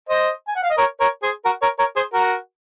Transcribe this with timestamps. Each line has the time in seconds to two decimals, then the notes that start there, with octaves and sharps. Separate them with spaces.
0.09 C5 D#5
0.48 G#5
0.56 F#5
0.63 F5
0.70 D#5
0.78 A#4 C#5
1.00 A#4 C#5
1.23 G#4 C5
1.45 F#4 A#4
1.62 A#4 C#5
1.79 A#4 C#5
1.96 G#4 C5
2.13 F#4 A#4